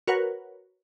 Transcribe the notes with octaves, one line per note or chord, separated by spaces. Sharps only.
F#4 A#4 B4 C#5 F#5